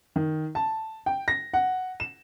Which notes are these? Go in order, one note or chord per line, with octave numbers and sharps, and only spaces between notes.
D#3
A5
G5
A#6
F#5
E7